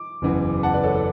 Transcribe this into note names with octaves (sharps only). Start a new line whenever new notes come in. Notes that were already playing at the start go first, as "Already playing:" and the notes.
Already playing: D6
F#1 E2 C#3 E3
F#5 A5
B4 D5
A4 C#5
B4
A4